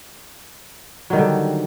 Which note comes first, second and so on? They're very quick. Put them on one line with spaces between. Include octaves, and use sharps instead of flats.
F#3 D#3 G3 D3